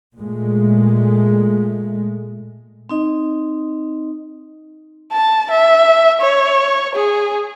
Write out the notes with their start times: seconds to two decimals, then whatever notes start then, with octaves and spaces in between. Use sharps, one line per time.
0.16 A#2 G#3 A3
2.89 C4 D#4 D#5
5.12 A5
5.50 E5
6.21 C#5
6.95 G#4